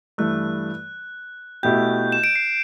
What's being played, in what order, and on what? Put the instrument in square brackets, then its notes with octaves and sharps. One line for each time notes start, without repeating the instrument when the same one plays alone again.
[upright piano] G2 E3 A3 [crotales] F#6
[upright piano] B2 A3 E4 G4 [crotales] G6
[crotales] E7
D7
C7